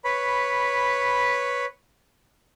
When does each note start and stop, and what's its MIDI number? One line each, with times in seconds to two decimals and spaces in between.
0.04 1.66 71
0.04 1.66 73
0.04 1.66 83